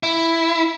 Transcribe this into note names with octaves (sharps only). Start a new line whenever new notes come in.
E4